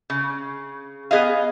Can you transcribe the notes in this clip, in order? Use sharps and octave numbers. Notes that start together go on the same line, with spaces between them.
C#3
B3 G#4 D#5 F5